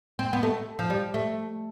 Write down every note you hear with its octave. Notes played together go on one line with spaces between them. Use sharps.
C4
B3
A3
F3
G3
A3